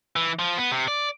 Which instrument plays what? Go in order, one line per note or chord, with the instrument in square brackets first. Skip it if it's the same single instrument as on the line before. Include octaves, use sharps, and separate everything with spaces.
[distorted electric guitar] E3
F3
B3
C3
D5